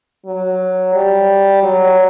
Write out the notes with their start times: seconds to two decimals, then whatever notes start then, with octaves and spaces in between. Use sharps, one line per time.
0.26 F#3
0.94 G3
1.63 F#3